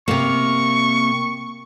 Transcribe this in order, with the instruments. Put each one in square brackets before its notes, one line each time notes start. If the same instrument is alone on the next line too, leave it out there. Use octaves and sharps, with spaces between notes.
[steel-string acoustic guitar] C3 A#3 [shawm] C#6